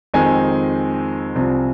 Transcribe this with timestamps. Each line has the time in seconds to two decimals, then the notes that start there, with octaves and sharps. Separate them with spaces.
0.14 F2 D#3 G#3 C4 D#4 G#5
1.36 C2 C3 F3